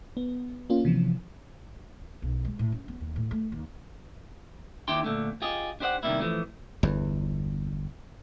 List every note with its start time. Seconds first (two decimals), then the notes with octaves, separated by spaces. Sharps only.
0.17 B3
0.70 A#3 C#4 F4
0.85 C3 E3 F3
2.22 B1
2.45 G#3
2.59 A2
2.72 C#4
2.88 B3
3.00 D#2
3.16 A2
3.31 A3
3.52 D#2
4.88 D#2 D4 E4 G4 G5 C6
5.04 A#2 D3 A3
5.42 F4 G4 G#4 D#5
5.80 D4 G4 C5 D5 F#5
6.03 C3 D#3 E3 G3 A#3 E4
6.20 E3 F3 A3
6.83 G1 E2